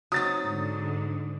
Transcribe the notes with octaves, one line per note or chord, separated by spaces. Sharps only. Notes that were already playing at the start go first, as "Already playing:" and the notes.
F#3 C4 D#4 D#6 A6
G#2 D3